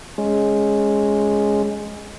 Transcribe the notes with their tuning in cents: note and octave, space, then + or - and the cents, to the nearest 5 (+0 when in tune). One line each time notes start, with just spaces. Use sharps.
G#3 +0 C#4 +0